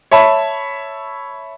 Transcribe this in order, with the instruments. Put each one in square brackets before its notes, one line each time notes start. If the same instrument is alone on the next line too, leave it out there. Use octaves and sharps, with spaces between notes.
[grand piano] C#5 E5 A5 B5